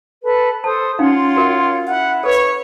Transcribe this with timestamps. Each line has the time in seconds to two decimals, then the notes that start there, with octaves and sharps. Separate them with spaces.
0.24 A4 B4 A5
0.64 A4 C5 A5 D#6
0.99 C#4 D#4 F4 C#5 F5 F#5 C6
1.36 F#4 A#4 E5
1.87 E4 F#5
2.23 A4 B4 C#5